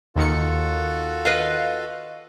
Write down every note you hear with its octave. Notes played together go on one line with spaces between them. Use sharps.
D#2 D#3 F4 F#4 A4 C#7
B4 D#5 F5